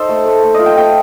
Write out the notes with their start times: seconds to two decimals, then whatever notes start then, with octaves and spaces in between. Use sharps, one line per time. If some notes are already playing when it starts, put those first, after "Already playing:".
Already playing: D#4 A4 C5
0.09 A3
0.25 A3
0.43 A3
0.54 F4 D#5
0.66 G5
0.77 A3 G5